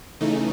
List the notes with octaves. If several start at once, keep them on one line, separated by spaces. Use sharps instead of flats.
C#3 E3 A3 D#4